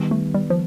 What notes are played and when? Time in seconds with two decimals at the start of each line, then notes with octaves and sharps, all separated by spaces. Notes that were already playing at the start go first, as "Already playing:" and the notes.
Already playing: D#3 G3 B3
0.11 A3
0.34 G3
0.50 F3